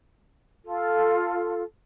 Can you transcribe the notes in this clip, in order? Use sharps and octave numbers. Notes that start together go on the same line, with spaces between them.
F4 A4